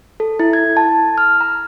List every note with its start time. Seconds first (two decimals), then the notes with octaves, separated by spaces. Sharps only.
0.20 A4
0.39 E4
0.53 G#6
0.77 A5
1.18 F6
1.41 A#5